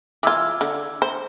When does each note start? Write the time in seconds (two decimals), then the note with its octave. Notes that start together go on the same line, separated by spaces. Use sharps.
0.23 E3 F4 D6 E6 G#6
0.61 D3
1.02 C5